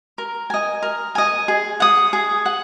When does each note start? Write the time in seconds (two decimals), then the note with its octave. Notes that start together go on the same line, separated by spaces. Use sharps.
0.18 A#4
0.50 D#5 G#5
0.82 A#4
1.15 D#5 G#5
1.48 G#4
1.80 F#5 D#6
2.13 G#4
2.46 F#5